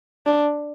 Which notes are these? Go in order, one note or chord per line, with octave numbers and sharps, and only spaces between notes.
D4